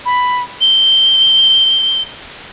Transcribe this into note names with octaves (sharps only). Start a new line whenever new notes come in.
B5
G7